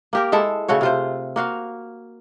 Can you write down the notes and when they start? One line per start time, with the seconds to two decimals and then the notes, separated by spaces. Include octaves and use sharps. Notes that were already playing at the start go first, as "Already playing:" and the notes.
0.13 A#3 G4 A#4
0.32 G#3 E4 A4 E5
0.68 C#3 A3 F#4 C#5
0.81 C3 F4 C5
1.36 A#3 F#4 F5